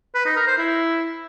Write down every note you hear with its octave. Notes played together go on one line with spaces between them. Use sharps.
B4
D#4
A#4
C5
E4